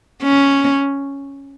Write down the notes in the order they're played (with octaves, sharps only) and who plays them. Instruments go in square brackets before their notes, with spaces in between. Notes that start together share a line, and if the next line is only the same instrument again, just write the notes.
[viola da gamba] C#4